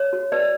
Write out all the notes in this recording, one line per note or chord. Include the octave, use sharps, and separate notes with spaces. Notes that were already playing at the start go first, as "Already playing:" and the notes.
Already playing: C#5
F#4
B4 D5